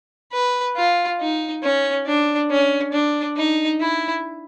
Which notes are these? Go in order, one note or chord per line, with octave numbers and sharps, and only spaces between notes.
B4
F4
D#4
C#4
D4
C#4
D4
D#4
E4